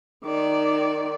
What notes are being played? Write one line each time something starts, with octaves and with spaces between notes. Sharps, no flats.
D#3 D5